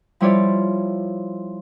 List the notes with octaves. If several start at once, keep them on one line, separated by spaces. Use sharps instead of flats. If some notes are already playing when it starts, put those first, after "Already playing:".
F3 G3 E4 F4 C#5 D5